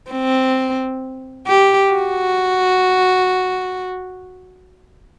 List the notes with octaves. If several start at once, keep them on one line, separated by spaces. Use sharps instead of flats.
C4
G4
F#4